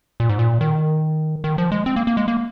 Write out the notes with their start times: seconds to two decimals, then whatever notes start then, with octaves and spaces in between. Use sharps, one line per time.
0.20 A#2
0.29 G#2
0.39 A#2
0.61 D#3
1.44 D#3
1.58 F3
1.72 G#3
1.86 C4
1.96 A#3
2.07 A#3
2.17 G#3
2.28 A#3